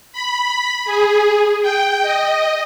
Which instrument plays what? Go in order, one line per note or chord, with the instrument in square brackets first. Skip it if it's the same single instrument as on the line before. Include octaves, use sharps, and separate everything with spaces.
[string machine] B5
G#4
G5
D#5